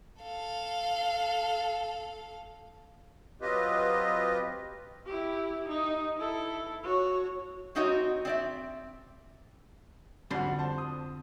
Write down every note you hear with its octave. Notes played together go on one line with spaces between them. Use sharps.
A4 F5
F#3 C4 F4 G4 B4 D#5
E4 G4
D#4
E4 A4
F#4 C#5
G3 C4 D#4 F#4 C#5 D#5
C4 D5 E5
F2 D3 G3 F#4 C6
C5 A5
D#6